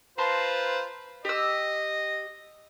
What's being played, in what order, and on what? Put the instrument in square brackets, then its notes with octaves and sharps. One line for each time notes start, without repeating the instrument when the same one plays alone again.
[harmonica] F4 B4 C5 [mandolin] A5 A#5 C6
[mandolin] G4 E6 [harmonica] D#5